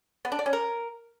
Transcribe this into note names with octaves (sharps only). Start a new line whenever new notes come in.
B3
D4
D5
C#4
A#4